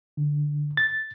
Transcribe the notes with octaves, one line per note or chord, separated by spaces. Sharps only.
D3
A6